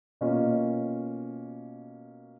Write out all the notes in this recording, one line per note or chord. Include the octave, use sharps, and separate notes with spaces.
B2 A#3 C#4 F4